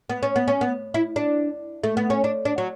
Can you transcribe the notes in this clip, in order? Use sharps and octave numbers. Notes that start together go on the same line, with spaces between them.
B3
C#4
B3
C#4
B3
E4
D4
A3
B3
C#4
D4
D4
F#3